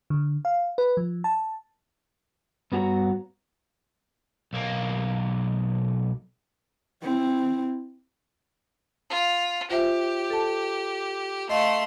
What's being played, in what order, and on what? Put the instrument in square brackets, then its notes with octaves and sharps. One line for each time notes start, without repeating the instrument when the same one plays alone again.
[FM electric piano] D3
F5
B4
F3
A5
[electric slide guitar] G2 B3 F#4 G4 C#5 A#5
[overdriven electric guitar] B1 A#3
[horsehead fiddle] C4 E4
[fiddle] F4
[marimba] F4 C5 E5 [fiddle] G4
[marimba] A4 A5
[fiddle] A3 C6 [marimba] D#5 F5